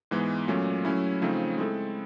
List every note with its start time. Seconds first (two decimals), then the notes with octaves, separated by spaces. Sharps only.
0.11 G#2 E3 G#3 B3
0.48 A#2 F#3 A3 C#4
0.85 F#3 A3 C#4 E4
1.22 C#3 F3 A3 C4 D#4
1.58 G#3 C4 E4 A4